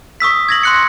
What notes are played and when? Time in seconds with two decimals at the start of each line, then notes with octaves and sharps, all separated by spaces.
0.20 C#6 D#6 E6 B6
0.49 G#6 A#6 F#7
0.63 C6 F#6 C#7